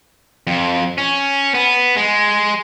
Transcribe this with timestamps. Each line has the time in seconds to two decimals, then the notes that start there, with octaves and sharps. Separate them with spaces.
0.47 F2
0.98 C#4
1.54 B3
1.96 G#3